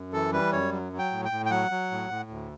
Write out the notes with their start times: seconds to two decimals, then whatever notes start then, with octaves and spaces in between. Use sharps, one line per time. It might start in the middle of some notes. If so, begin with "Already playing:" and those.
Already playing: F#2
0.13 E3 A4
0.33 G3 B4
0.52 F#2 C#5
0.72 F#3
0.93 F#3
0.99 G5
1.12 A2
1.25 G5
1.31 A2
1.46 G5
1.51 F#3 F#5
1.71 F#3
1.91 A2
2.10 A2
2.30 D2